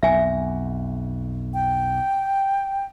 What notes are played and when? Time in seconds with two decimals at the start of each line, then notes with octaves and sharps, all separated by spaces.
0.03 B1 F2 E5 G#5
1.54 G5